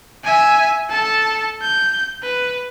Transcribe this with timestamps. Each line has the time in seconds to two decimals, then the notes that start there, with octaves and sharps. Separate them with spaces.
0.24 E5 G#5
0.89 A4 A5
1.62 G6
2.22 B4